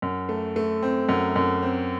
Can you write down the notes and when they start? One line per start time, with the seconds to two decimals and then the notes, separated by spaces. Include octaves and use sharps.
0.02 F#2
0.29 A3
0.56 A3
0.83 C4
1.09 F#2
1.36 F#2
1.62 C4